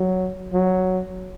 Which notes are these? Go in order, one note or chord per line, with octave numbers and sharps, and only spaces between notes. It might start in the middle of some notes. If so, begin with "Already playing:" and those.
Already playing: F#3
F#3